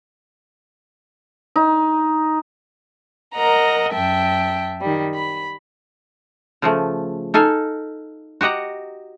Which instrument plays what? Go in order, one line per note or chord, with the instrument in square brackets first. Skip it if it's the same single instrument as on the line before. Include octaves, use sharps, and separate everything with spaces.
[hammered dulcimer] D#4
[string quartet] A#4 D#5 F#5 A#5
F#2 E5 G5 A5
D#3 G3
B5
[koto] C#3 F3 A3
D#4 A4 F5 G#5
F#4 G4 D#5 F#5 A#5